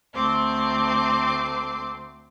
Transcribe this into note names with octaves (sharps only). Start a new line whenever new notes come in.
D2 A3 C4 C6 D6